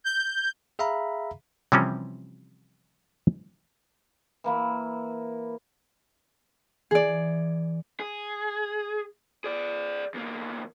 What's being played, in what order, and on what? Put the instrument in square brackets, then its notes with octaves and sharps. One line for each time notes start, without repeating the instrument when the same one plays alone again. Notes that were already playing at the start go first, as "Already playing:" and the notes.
[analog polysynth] G6
[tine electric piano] G#4 E5 F5 A#5 B5
[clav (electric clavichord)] C3 E3 F3 G3 C4 C#4
[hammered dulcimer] E3 A#3 B5
[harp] E3 [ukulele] G#4 D5
[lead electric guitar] G#4
G#4 D5
E2 A#3